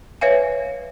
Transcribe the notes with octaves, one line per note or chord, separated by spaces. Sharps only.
B4 C#5 E5 F5 G#5